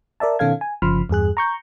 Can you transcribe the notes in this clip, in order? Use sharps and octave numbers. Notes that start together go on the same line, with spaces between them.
A#4 D5 E5 A5
B2 D#3 C#4 A4 F5 G#6
G#5
G1 C#3 F3 B5 C6 F6
E2 G2 G#4 F#6
A#5 C#6 G6